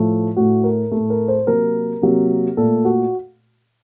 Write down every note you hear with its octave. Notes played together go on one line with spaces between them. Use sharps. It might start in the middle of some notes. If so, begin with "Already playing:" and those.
Already playing: A2 F3 A3
A2 A3 F#4
A#4
A3
A2
A#4
C5
C3 F#3 A#3 A#4
C3 F#3 A#3
A#2 A3 A4
F#4